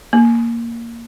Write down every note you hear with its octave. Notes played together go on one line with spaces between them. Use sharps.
A#3